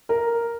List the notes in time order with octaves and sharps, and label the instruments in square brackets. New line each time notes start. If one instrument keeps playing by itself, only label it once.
[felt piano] A#4